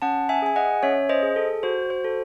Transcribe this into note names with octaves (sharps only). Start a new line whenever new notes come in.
C#4 F#5 A5
E5 G#5
G#4 G#5
D#5 F#5
C#4 C#5 E5
C5 D#5
G#4
A4
F#4 C5
C5
A4